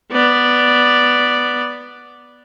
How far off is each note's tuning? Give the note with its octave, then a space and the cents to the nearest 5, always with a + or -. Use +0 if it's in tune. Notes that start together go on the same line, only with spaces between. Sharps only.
B3 +0 D5 +0